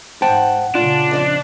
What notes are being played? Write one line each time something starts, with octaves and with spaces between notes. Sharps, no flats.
G#2 C5 F#5 G5 A5
A#2 C#3 D4 F4
F2 D5 D#5